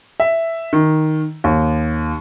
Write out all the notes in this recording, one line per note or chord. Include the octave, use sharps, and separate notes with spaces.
E5
D#3
D#2